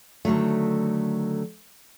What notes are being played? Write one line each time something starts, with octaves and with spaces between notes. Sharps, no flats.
D3 D#3 F#3 A3